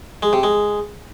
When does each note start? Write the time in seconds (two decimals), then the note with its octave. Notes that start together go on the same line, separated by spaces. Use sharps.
0.23 G#3
0.33 C3
0.43 G#3